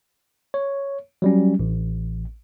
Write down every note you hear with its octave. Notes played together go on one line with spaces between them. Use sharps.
C#5
F#3 G3 C#4
A1